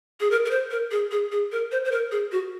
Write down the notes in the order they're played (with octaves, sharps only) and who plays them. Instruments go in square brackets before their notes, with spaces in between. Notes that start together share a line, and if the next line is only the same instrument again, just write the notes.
[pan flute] G#4
A#4
A#4
C5
A#4
G#4
G#4
G#4
A#4
C5
C5
A#4
G#4
F#4